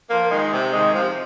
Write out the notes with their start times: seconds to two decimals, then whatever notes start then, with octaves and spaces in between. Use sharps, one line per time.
0.10 F3 A#3
0.31 D#3 G#3
0.53 C3
0.73 D#3 G#3
0.95 C3 F3